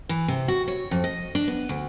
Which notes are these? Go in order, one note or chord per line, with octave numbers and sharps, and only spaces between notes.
E3
C3
F#4
C#5
F2
D#5
D4
B3
D2